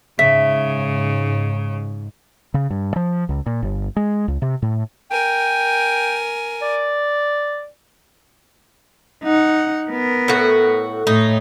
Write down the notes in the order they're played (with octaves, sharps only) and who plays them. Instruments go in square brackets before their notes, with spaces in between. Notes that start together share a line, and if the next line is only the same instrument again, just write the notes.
[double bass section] G#2 [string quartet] C#3 [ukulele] E5 [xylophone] B6
[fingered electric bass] C#3
G2
F3
C#2
A#2
G1
G#3
C#2
C3
A2
[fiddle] A#4 G#5 [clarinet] G5
[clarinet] D5
[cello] D#4 F#5
B3 A#4
[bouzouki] A2 F#4
[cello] A2 C#5 [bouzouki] D#4